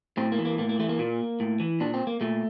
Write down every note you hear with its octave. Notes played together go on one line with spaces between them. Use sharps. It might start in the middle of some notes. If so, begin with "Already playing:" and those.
A2 C4
A#3
E3
A#3
A2 A#3
A#3
E3 A3
A#3
A#2
A2
E3
A#2 D4
C4
A#3
A#2 A3